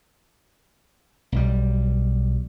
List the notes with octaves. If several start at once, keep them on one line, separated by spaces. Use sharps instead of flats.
B1 G3